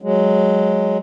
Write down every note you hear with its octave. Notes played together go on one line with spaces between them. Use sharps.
F#3 G#3